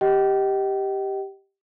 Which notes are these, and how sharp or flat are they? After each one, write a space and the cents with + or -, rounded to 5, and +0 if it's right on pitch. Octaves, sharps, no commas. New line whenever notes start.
G4 +0 D#5 +10 G5 -40